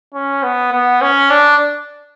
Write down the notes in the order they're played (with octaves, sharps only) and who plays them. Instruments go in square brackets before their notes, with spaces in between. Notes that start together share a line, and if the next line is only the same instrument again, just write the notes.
[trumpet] C#4
B3
B3
C#4
D4